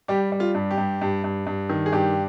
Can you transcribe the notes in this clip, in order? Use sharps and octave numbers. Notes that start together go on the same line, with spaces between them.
G3 G4
G3
F4
G2
G4
G2
G2
G2
G2
D#3
G#4
G2 G4